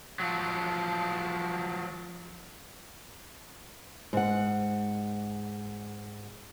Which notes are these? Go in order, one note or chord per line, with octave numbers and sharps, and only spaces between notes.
F3 F#3
G#2 F#5